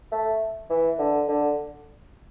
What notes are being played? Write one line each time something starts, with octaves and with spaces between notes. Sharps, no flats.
A3
E3
D3
D3